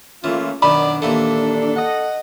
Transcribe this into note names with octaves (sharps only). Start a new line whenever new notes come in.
E3 A3 A#3 C#4 F4
F#2 B2 D#3 D4 D5 B5
D#2 A#2 E3 A4
D#5 F#5